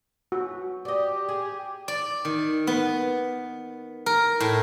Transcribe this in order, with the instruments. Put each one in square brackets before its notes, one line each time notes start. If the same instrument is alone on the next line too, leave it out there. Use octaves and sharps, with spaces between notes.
[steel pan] F#4
[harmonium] G4 [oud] D5 D#5
[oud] G#4
[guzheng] D5
D#3
B3
A#4
A2